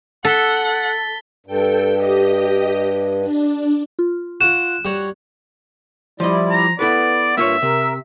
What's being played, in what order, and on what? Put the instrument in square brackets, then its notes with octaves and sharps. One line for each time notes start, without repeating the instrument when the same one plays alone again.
[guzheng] A4 [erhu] F#5 [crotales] A6 B6 G7
[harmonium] G2 [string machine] A4 G5
[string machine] G4 D#5
D4
[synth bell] F4
[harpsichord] F4 F#4 [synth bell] F#6 [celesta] E7
[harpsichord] G3 F#4 C#5
[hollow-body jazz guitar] F3 D#5 [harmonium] G3 E4 D5
[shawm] A#5
[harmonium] B3 [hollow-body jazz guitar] E4 A4 B4 [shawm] D5
[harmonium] G2 [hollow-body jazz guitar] A#3 F4 C#5 [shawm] E5
[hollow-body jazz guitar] C3 [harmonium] A#4